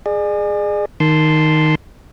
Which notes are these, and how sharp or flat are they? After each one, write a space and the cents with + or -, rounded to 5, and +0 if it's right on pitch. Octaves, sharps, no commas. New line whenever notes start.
G#4 +0 D5 +40
D#3 +0 A5 -5 C6 -5